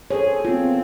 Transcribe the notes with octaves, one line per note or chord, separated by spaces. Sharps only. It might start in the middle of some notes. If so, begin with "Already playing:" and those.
G#4 A4 C5 C#5
B3 C4 F4